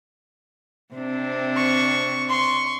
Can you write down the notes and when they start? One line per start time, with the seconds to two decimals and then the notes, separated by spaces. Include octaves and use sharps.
0.94 C3 C4 D4
1.57 C#6
2.30 C6 C#6